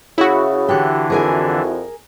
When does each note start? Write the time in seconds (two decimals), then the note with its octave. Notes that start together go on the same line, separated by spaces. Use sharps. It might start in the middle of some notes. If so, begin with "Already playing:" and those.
0.18 C#3 E4 F#4
0.68 D3 E3 D4 G4 F#5
1.10 F2 G#4 A#4 G#5